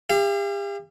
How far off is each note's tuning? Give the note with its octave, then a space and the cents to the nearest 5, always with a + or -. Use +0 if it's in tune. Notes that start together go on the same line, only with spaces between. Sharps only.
G4 +40 F5 -40